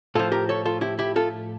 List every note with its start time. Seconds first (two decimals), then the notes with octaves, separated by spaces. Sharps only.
0.15 A2 F3 F4 A4
0.32 G4 A#4
0.49 A4 C#5
0.65 F4 A4
0.81 E4 G4
0.99 E4 G4
1.16 F4 A4